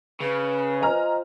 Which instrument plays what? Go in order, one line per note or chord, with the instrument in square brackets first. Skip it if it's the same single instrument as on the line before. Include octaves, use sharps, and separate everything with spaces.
[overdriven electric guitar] C#3 [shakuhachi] B4
[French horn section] F4 C5 D#5 [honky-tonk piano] G#5 A#5 F6